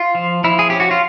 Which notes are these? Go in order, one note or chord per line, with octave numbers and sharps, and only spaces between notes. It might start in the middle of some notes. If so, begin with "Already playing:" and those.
Already playing: F4
F3
F3 E4
G#4
C#4 G4
F#4
F4